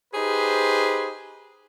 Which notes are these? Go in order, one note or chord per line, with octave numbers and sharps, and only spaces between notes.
D#4 G4 G#4 B4 C5